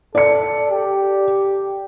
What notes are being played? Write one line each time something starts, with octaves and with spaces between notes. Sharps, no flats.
A4 D5 C#7
G4